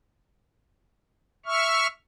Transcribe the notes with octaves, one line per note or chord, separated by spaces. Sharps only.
E5 C#6 F6